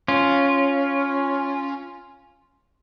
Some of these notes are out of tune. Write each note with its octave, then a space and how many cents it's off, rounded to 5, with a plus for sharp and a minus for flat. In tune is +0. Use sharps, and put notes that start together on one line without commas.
C#4 +0 F4 +0